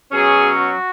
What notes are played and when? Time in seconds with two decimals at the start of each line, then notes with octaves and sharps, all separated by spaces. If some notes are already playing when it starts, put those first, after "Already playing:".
0.12 B2 F#3 C#4 G#4
0.55 F#4